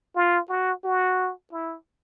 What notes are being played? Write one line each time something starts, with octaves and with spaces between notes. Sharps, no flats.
F4
F#4
F#4
E4